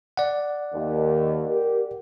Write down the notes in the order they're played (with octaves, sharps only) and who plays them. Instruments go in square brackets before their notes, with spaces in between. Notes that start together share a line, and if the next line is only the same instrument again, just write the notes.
[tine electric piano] D5 F#5
[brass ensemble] D#2
G4 A#4